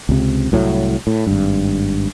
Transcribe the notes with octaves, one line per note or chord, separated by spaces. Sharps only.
C#2 C3
C2 A2 F#3
A2
G#1 G2